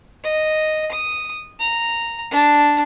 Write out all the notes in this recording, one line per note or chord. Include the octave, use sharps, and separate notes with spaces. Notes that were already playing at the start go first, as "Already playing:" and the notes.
D#5
D#6
A#5
D4 A5